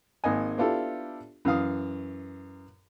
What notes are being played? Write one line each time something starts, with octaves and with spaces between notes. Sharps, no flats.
G#1 A#3 D#5 G#5
B3 D4 E4 F4 G4 A4
F#2 E3 F5 D#6